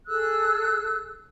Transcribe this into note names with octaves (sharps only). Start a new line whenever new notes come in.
G#4 A4 E6 F#6